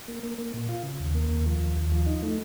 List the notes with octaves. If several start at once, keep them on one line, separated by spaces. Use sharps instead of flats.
A#3
A#3
A#3
A#2
F4
C#3
D#2
A#3
D#2
F3
D#2
D#2
F3
D#4
A3